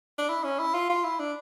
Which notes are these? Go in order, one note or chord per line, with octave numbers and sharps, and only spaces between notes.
D4
E4
C#4
E4
F4
F4
E4
D4